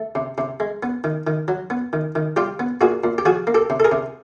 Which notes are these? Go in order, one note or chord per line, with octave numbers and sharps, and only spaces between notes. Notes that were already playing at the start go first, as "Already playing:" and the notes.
Already playing: A3
C3
C3
G#3
B3
D#3
D#3
F#3
B3
D#3
D#3
G3 F4 G4
B3
A#2 F#4 G#4
A#2
G4
F3 F#4 G#4
A#3
G4 A4
C3
A4
G#4 A#4
C3